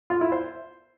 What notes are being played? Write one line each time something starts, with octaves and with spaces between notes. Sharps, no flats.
F4
E4
C5